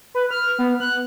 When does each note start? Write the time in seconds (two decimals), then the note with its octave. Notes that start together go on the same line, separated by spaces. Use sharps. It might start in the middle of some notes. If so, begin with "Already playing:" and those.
0.15 B4
0.31 F6
0.59 B3
0.80 F#6